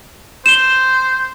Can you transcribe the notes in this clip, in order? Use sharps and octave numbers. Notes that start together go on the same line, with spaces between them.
C5 E7 G7